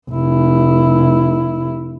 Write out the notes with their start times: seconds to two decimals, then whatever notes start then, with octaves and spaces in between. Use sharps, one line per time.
0.10 F1 E4